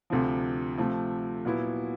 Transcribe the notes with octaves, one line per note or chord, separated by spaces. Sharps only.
D2 C3 F3
C3 F3 A3
A#2 F#3 B3 E4